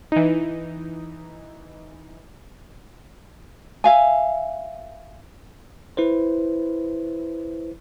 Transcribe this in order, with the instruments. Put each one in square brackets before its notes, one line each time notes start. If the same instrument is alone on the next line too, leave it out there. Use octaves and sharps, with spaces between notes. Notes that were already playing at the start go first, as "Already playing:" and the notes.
[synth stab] E3 D#4
[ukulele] E5 F5 G#5
[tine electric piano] E4 B4 C5